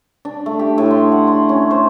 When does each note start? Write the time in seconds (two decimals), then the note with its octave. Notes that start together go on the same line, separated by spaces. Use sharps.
0.25 D4
0.46 A3
0.59 G4
0.78 A2
0.91 C6
1.12 F#5
1.27 C6
1.49 C#4
1.71 C5